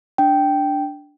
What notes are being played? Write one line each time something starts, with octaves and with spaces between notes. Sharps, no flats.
D4 G5